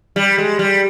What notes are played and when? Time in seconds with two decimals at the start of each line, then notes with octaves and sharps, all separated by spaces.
0.16 G3
0.38 G#3
0.59 G3